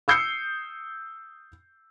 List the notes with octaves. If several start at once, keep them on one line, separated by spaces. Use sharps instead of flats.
D#6 E6 G6 C7 C#7